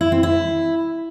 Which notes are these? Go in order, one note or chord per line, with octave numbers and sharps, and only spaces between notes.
E4
C4
E4